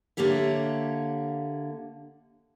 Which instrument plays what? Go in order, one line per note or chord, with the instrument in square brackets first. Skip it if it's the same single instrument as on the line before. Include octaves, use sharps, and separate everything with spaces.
[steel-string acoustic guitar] D3 A#3 G4 C#5 E5